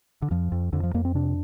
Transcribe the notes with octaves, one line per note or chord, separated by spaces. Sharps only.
D3
F2 F3
F2
F2 D3
F3
F2 A#3
C4
C3 D4